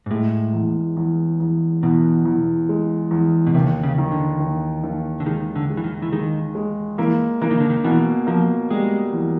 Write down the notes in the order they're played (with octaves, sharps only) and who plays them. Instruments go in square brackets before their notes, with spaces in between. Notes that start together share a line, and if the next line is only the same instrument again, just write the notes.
[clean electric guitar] G#2
[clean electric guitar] A2 [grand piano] G#3
[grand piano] E2
E2
E2
[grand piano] E2 [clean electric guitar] B2
[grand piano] E2
G#3
E2
[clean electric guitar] B2
[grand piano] D#2 [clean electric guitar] C3
[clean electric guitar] C#3
[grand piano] D#3
[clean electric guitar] D3
[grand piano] D#2
D#2
[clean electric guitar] D3
[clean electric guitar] D#3 [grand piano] G#3
[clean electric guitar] D3
[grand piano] G#3
[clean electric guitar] E3
D#3
E3
[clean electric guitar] D#3 [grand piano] G#3
[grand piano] G#3
[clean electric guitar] E3 [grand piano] A#3
[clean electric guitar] E3 [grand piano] A#3
[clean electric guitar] D#3
D3
D#3
[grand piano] B2 [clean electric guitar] E3
[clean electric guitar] F3 [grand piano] A#3
[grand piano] G3 [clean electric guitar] G#3
[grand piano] E2